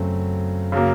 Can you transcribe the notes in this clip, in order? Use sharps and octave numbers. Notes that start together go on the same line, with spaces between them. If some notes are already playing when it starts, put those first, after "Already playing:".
Already playing: F#2 C#3 F#3 A3 C4
C#3 F#3 A#3